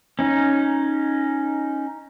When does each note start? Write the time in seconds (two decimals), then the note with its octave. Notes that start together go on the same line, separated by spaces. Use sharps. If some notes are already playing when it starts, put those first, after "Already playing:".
0.19 C#4 D#4